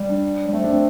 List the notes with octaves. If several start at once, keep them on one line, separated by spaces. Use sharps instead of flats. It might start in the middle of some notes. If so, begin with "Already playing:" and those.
Already playing: G3
D4
G3
A3 C4
D4
C4